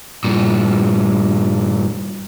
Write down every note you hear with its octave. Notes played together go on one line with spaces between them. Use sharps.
G2 A#2